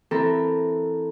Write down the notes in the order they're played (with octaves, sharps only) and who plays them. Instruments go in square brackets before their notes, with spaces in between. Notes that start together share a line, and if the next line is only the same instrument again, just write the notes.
[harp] E3 C4 A4 A#4 A#5